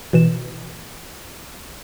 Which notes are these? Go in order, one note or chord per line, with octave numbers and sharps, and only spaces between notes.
B2 E3 E7